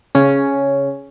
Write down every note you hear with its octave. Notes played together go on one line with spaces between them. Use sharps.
C#3 C#4